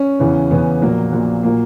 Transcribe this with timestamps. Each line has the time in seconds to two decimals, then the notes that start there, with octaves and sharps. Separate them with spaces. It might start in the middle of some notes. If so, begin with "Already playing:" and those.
Already playing: C#4
0.19 E2 C#3 E3
0.51 E2 C#3 E3 B3
0.82 A#1 A#2 F#3 A#3
1.12 A#1 A#2 F#3
1.43 A#2 F#3 A#3